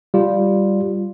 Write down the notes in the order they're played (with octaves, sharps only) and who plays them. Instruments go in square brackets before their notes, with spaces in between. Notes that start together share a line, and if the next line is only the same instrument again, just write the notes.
[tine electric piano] G3 F4